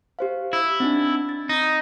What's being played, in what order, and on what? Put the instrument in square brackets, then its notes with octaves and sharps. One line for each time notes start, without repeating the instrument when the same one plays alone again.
[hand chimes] G4 C5 F5
[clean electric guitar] E4
[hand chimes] C4 D4 D#4
A6
[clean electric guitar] D#4